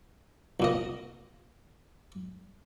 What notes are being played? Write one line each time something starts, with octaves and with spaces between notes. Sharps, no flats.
C2 A#2 D#5